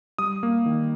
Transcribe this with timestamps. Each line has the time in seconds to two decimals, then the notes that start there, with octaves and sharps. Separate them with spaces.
0.18 G3 D#6
0.43 A#3
0.66 D#3